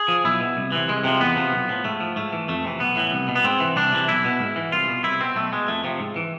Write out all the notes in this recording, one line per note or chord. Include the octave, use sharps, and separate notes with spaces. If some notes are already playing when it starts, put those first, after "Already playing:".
Already playing: G#4
F3
B1 E4
B2
C2
C3 E3
C2 G#3
C3 F3
E2 B3
C3 F3
B1
A2 F3
G#2 A3
F3
G#2 A3
E3
F2 A3
C3 E3
B1 B3
A2 E3
C2
B2
B3
G#2 C4
E3
C2 D4
C3 E3
B1 E4
B2
G#2
E3
C2 F4
B2
C2 E4
B2 C4
B1 A3
B2 G#3
F2 A3
C3 F3
G#2
E3